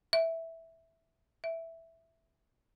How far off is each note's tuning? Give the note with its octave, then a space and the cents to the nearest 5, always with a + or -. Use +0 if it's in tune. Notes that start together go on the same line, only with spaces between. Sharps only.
E5 -5
E5 +0